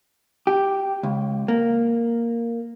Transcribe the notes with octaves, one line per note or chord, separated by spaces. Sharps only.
G4
C#2
A#3